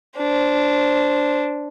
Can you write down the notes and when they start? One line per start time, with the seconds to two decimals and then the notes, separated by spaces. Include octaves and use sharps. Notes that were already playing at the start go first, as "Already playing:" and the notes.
0.17 D4 C5